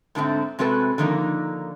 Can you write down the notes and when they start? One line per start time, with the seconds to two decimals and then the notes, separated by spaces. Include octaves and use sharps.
0.15 G#2 D3 G#3 A3 C4
0.59 C3 G#3 C4 F#4 A4 B4
0.98 D3 D#3 F3 A#3 D#4